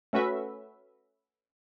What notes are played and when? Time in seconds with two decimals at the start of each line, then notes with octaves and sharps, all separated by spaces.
0.13 A3 C#4 F#4 B4 E5